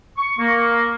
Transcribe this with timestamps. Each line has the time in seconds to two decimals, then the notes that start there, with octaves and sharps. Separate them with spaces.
0.16 C#6
0.39 A#3